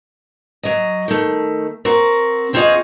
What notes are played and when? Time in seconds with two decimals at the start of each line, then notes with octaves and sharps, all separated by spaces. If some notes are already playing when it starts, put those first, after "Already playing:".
0.63 F#3 D#5
1.08 D#3 A3
1.85 C4 F#4 A#4
2.53 E2 C4 F4 F#4 G#4 D#5